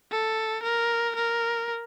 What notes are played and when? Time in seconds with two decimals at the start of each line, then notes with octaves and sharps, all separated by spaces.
0.11 A4
0.63 A#4
1.15 A#4